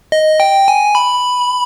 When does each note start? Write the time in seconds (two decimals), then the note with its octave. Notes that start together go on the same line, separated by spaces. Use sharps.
0.12 D#5
0.40 G5
0.68 G#5
0.95 B5